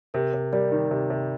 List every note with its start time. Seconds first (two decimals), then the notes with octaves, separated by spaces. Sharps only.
0.14 C3 A#4
0.33 C3
0.53 G3 A#4 D5
0.72 D#3
0.91 C3
1.10 C3